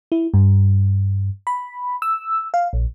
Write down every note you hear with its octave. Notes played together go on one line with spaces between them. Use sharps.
E4
G2
B5
E6
F5
A#1